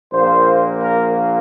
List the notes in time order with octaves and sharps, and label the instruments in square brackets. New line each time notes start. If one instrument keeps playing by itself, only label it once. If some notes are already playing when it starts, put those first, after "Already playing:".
[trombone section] A#1 A#2 A#3 C5
A#4